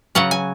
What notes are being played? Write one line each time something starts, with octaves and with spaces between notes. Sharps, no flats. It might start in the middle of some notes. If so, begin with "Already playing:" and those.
C#3 F#3 C#4 F#5
G#5